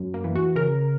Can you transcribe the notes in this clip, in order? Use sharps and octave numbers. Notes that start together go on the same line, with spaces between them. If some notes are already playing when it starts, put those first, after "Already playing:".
Already playing: F#2
A#3
E3
F#4
C#3 A#4